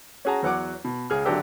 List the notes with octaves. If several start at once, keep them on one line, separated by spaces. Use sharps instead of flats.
C#4 F#4 G#4 A5 A#5
E2 F#3 F#5 D6
B2
C#2 G#4 F6
G#1 D3 F#3 D4 G4 E6